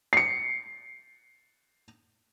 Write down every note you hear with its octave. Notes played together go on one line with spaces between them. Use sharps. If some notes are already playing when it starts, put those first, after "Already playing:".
C7 C#7